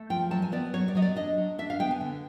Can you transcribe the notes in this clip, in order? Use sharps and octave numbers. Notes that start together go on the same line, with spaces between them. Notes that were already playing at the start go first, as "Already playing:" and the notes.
Already playing: A3
F3 G5
F#3 A5
G#5
B3 D5
F#3 C#5
D5
F#3 D#5
D5
D4 D#5
F#3
D4 E5
F5
B3 G5
G#5
D3